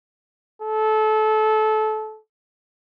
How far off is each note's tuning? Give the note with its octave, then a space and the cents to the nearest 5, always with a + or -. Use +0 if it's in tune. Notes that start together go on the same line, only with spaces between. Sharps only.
A4 -25